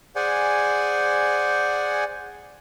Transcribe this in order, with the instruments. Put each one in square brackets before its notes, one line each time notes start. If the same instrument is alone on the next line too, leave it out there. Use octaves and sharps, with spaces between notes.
[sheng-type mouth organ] G#4 C5 D5 F#5 G#5